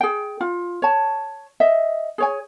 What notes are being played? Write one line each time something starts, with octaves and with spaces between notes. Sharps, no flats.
G#4 G5
F4
C#5 A5
D#5 E5
G#4 C#5 G#5